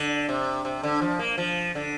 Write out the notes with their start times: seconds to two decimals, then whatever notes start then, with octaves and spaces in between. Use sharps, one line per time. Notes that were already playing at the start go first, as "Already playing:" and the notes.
Already playing: D3
0.29 C3
0.65 C3
0.83 D3
1.02 F3
1.19 A#3
1.38 F3
1.75 D3